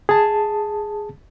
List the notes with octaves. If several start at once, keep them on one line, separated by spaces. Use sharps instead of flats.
G#4 A5